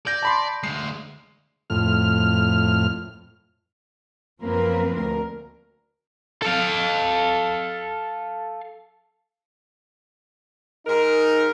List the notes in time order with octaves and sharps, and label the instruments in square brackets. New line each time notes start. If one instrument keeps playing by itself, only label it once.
[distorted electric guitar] D5 [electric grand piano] G6 A#6
[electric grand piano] A5 B5 C6
[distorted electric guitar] D2 G#3 [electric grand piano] C7
[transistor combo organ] F2 A2 F6
[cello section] F#2 F3 A#3 C4 A#4 B4
D2 A#4
[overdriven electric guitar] A4 F5
[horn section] G#2 D#4 A#4